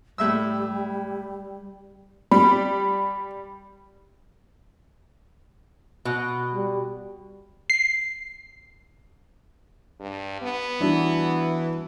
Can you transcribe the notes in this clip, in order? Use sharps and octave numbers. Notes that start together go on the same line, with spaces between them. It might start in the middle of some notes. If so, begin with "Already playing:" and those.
A2 G3 E5 E6
G3 B5
B2
G3
C7
G2
B3
E3 G3 D4 F#4